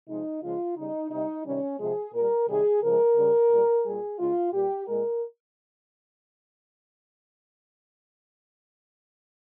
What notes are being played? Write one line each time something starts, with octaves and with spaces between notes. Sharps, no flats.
C3 F3 G#3 D#4
C#3 F3 G#3 F4
C#3 G3 D#4
C3 G3 D#4
C3 D#3 G3 C#4
C3 F3 G#3 G#4
A#2 G3 A#4
C3 D#3 G3 G#4
C#3 F3 G#3 A#4
C#3 G3
A#2 G3
A#2 G3 G#4
C#3 G#3 F4
A#2 G3 G4
A#2 G#3 A#4